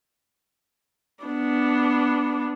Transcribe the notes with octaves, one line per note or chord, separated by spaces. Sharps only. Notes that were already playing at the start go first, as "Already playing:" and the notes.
B3 D4